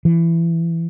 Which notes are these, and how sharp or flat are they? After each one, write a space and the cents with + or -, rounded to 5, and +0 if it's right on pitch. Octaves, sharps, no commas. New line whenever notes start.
E3 +20